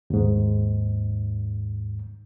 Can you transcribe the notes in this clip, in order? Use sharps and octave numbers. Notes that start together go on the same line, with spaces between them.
D#2 G#2